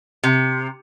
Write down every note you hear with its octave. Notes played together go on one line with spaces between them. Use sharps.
C3